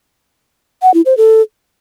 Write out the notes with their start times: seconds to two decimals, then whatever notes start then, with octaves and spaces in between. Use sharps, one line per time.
0.82 F#5
0.94 E4
1.06 C5
1.17 A4